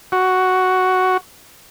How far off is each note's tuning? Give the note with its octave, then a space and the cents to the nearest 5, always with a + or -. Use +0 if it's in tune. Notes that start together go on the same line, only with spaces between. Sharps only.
F#4 +5